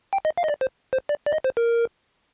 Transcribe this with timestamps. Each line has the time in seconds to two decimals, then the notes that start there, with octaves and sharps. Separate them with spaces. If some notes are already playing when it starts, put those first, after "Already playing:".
0.13 G5
0.25 D#5
0.37 F5
0.44 D#5
0.48 D5
0.61 C5
0.93 C5
1.09 D5
1.26 D5
1.33 D#5
1.44 C5
1.57 A#4